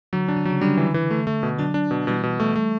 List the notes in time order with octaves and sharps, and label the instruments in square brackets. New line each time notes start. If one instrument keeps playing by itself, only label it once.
[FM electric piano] D3 [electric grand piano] F#3
[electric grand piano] D4
[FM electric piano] D3
[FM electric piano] C#3 [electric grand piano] F#3
[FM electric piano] D3 [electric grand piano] G3
[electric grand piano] E3
E3
A3
A3
B2
[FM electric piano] D3 F#3 [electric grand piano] D4
[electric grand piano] D4
B2
[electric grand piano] B2 [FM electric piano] E3 G3
[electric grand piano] B2
A3
A3